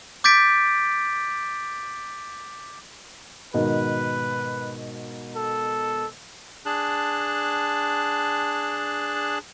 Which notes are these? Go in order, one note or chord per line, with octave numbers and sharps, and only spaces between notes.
D6 G6 A6 B6 D7
G#2 B2 D#3 B4
A4
D4 G#4 A5 F#6